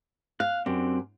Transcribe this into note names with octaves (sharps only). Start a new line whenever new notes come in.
F5 F#6
F#2 C4 D4 G4